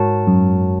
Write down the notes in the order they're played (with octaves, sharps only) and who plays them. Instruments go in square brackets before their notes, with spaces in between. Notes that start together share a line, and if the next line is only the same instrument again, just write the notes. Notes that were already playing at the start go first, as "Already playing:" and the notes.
Already playing: [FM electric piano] G#2 [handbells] F#4 A#4 C#5 F#5 A5
[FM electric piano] F#2